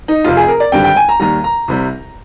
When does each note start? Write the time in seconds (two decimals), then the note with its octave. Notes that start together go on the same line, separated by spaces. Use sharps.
0.08 D#4
0.24 F1 F2 C3 F4
0.37 G#4
0.48 A#4
0.60 D5
0.72 G#1 G2 D3 G3 G5
0.84 G5
0.96 G#5
1.09 A#5
1.20 D#2 D#3 G3 A#5
1.44 A#5
1.68 C2 C3 G3